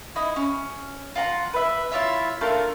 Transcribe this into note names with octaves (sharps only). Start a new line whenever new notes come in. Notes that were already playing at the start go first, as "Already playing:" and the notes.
D#4 E4
C#4
F4 F#5 A#5
B4 E5
E4 F4 C#5 E5
A3 D4 F4 A#4